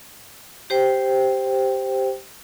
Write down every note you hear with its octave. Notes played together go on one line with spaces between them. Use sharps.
G4 C5 G5